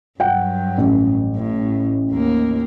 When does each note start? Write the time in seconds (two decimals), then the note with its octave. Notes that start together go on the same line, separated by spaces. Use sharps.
0.20 G2 F#3 F#5 G5
0.78 A1
1.36 A2
2.11 D#2 A#3